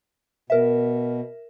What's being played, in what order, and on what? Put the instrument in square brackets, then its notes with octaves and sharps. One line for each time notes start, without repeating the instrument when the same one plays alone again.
[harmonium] B2 [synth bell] A#4 E5